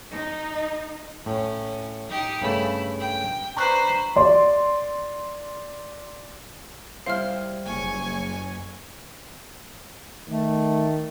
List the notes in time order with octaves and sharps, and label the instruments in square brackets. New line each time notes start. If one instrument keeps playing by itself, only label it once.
[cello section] D#4
[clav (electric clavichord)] A2 [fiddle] C#4
[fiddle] D#4 G4
[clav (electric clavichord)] G2 C#3 A3 [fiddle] E4
[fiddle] G5
[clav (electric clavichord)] D4 [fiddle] B4 C5 [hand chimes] A#5 C#6 F#6
[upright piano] D5 C6
[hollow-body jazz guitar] G3 E4 C5 [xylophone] F5 F6
[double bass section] F#1 [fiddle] G#5 C#6
[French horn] D#3 [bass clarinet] A3